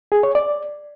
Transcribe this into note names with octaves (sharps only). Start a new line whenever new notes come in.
G#4
C#5
D5